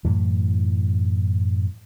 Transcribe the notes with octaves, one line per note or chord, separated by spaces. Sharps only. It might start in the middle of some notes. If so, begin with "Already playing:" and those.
F#2 A2 E3